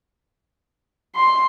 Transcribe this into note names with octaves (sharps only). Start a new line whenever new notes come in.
C6